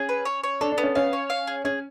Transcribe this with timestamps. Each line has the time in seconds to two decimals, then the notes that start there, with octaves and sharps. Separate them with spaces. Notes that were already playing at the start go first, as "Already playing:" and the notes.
Already playing: C#4 G#4
0.09 B4
0.25 C#5
0.43 C#5
0.61 D4 A4
0.72 D4
0.78 B3
0.83 C#4
0.95 C#4 F5
1.13 C#5
1.30 F5
1.47 G#4
1.65 C#4 G#4